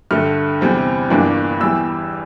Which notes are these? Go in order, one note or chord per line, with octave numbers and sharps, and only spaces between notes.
G2 D3 A3 F6
E2 C3 G3 C4
G1 G2 E3 A#3 D4
E2 E3 G3 E6